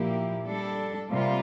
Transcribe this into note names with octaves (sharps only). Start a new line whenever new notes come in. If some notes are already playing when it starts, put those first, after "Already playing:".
Already playing: A#2 F3 A#3 E4 G4
G3 D4 A4
C3 G3 A#3 F4